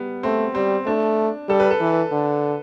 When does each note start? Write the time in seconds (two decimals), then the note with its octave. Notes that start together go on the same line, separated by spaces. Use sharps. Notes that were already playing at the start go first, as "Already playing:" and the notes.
Already playing: G3 B3
0.23 A3 C4
0.55 G3 C4
0.86 A3 D4
1.49 G3 A4
1.60 B4
1.71 A4
1.80 E3
2.12 D3